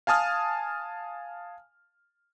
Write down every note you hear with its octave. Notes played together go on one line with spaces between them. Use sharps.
F5 G#5 A5 D#6 F6